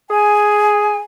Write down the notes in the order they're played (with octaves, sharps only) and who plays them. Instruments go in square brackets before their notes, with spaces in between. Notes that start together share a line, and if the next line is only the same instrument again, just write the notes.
[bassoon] G#4 [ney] G#5